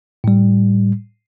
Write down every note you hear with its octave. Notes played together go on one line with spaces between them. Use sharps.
A2 G3